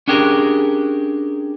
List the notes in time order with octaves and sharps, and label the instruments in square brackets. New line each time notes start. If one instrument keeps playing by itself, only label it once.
[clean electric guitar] C#4 D4 G4 G#4 A#4